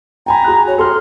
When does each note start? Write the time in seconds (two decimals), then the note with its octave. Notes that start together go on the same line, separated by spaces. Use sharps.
0.26 G5 G#5 A#5 B5
0.44 F#4 G#4 F#6
0.67 C#5
0.78 A4 C6 F6